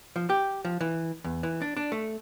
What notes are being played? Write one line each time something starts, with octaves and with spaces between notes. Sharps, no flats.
F3
G4
F3
E3
E2
E3
D4
D4
A3